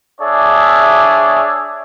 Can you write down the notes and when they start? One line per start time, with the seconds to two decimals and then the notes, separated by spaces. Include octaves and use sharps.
0.21 D4 G#4 C#5 D5 E5